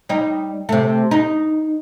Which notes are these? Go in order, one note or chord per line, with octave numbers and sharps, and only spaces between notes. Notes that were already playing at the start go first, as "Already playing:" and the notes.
G3 D#4
C3 A3
D#4